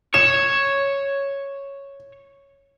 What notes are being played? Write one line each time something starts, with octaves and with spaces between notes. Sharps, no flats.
C#5 E7